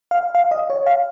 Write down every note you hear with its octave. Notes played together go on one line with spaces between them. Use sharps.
F5
F5
D#5
C#5
F5